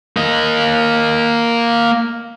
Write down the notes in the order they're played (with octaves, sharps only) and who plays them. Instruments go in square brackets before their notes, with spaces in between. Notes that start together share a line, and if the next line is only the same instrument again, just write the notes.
[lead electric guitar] A#3 D#5